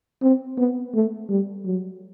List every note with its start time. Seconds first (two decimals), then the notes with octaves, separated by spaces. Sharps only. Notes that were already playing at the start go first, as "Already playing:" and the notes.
0.22 C4
0.58 B3
0.94 A3
1.30 G3
1.66 F#3